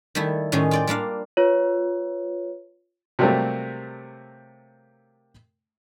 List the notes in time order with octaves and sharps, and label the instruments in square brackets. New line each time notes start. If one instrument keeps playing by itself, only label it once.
[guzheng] D#3 G3 A3 E4
A2 D#3 G#3 C#4 G#4
F4 D5 G5
G3 A#3 D4 F5
[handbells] F4 B4 C#5
[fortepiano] C3 F#3 G3 A3 A#3 C4